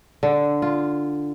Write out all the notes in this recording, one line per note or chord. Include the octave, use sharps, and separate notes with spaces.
D3
F4